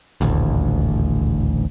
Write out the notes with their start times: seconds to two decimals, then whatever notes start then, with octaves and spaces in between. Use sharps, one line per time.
0.21 D#1 A1 D2